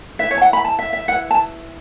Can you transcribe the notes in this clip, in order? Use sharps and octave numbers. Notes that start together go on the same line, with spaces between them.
E4 B4 E5
C#5
A5
F#5
B5
A5
E5
E5
E4 B4 F#5
A5